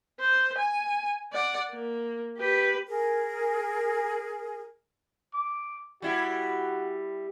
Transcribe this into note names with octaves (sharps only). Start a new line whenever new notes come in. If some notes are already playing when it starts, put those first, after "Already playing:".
C5
G#5
D5 F#5
A#3
G4 B4
G#4 A#4
D6
G3 E4 F#4